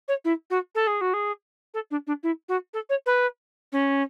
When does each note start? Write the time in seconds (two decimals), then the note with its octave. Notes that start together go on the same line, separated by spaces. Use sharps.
0.08 C#5
0.25 E4
0.50 F#4
0.75 A4
0.87 G#4
1.01 F#4
1.13 G#4
1.74 A4
1.91 D4
2.07 D4
2.23 E4
2.49 F#4
2.73 A4
2.89 C#5
3.06 B4
3.72 C#4